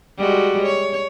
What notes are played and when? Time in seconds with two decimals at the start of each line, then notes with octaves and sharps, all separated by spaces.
0.18 G3 G#3 F#4
0.64 C#5